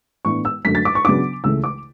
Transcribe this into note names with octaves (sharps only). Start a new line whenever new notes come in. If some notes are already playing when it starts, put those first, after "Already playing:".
A2 E3 B3 D4 C#6
E6
F#2 D3 F#3 A3 B6
A6
D6
C#6
C#3 F#3 B3 D4 D6
C#2 C#3 E3 A3 E6
D6